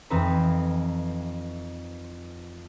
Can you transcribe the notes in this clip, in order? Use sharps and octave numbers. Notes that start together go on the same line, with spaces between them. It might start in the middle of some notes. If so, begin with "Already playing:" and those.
F2 E3 C4 D#4 B4 A#5